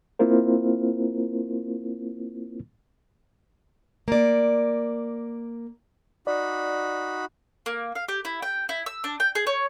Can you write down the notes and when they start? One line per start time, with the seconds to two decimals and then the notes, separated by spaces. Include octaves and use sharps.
0.19 A#3 C4 E4 F4 A#4 C5
4.08 A#3 D5
6.27 D#4 F#4 D5 B5
7.66 A#3
7.95 F5
8.08 G4
8.25 E4
8.42 G5
8.69 E4
8.86 E6
9.04 D4
9.20 G5
9.35 G#4
9.47 C#5